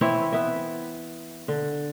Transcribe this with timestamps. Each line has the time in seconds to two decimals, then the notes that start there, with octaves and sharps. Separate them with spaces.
0.01 E3 C4 E4 C#5
0.32 B3 E5
1.48 D3